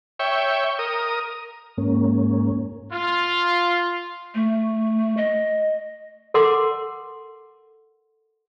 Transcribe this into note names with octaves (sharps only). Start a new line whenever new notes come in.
C#5 E5 G5
A#4 D#6
G#2 A#3 C#4
F4
A3
D#5
A4 A#4 F#5 C6 D6